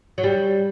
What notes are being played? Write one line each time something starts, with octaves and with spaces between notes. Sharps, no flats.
F#3
G3